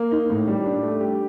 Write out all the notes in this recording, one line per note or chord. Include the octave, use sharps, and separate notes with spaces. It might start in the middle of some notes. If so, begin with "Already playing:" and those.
Already playing: A#3
D#4
A2
G3
D4
A3
G4